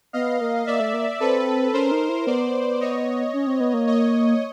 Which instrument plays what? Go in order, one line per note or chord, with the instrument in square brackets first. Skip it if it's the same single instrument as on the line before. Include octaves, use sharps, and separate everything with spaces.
[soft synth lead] B3 [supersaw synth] D#5 F5
[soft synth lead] A#3
[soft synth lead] A#3 [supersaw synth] D5 E5
[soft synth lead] A3
A#3
[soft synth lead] C4 [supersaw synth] A4 B4
[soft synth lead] C#4 [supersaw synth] A#4 C5
[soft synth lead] D#4
E4
[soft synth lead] B3 [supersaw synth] C5 D5
[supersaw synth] C#5 D#5
[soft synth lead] C#4
C4
B3
A#3
[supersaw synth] C#5 D#5